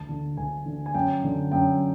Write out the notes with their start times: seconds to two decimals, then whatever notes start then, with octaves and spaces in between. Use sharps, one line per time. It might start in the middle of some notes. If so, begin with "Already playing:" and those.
Already playing: D2 A5
0.09 D3
0.37 D2 G#5
0.66 D3
0.86 G#5
0.94 F#2 G5
1.24 D3
1.52 F#2 G5